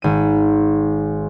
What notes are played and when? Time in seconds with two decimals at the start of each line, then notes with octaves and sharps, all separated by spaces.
0.02 G#1 D#7